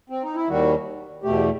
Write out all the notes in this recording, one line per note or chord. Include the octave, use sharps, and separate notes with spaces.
C4
D#4
E4
D#2 D#3 G3 F#4
E2 B2 A3 G4